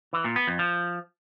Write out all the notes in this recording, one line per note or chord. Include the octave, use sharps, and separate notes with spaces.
E3
A#2
B3
F2
F3